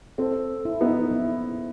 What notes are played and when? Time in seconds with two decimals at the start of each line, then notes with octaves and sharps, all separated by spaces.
0.18 C4 A4
0.65 E4
0.81 B3 D#4
1.12 E4